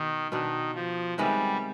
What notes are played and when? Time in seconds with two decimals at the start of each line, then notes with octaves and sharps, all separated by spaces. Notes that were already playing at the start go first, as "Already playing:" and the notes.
Already playing: B2 D#3 B3
0.32 B2 D#3 B3 D4
0.75 F3
1.18 C3 D#3 G3 G#3 B3